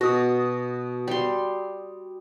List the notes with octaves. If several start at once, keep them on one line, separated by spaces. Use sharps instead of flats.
B2 F#4 D#6
G3 C6